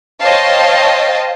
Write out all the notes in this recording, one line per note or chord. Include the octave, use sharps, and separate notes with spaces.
C5 C#5 D#5 F5 G5 A5